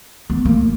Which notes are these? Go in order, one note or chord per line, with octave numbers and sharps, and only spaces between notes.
B3
A#3